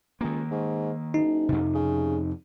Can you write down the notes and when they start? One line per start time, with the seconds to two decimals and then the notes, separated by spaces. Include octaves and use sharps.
0.21 C#2 D#3 A#3
0.51 G#2
1.14 F#1 D#4
1.49 F2 C3
1.75 C#3